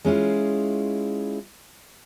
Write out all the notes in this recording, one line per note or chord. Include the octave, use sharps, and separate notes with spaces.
G#3 C#4 E4 F4